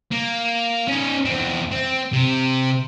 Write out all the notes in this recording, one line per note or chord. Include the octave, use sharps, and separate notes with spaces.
A#3
C#4 D#4
E2 C4
C4
C3